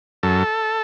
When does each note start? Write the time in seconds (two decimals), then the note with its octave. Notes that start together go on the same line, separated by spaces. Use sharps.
0.23 F#2 A4